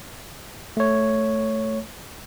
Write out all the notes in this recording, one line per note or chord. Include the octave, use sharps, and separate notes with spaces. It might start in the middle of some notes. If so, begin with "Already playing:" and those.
A3 C#5